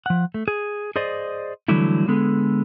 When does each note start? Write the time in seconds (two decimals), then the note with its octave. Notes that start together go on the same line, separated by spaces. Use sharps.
0.06 F3 F#5
0.34 A3
0.48 G#4
0.96 G#4 C5 D5 D#5
1.68 D3 E3 F#3 G3 A3 E4
2.08 D3 G#3 B3 G#4 A4